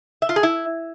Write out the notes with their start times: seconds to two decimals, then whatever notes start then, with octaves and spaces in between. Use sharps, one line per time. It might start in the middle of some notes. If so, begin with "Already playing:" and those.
0.22 E5
0.29 F4
0.36 G#4
0.43 E4